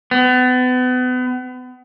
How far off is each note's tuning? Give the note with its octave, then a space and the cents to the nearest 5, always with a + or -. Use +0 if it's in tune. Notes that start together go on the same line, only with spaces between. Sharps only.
B3 +35